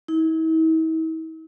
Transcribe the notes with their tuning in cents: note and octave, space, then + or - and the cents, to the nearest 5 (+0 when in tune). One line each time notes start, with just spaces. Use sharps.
E4 -45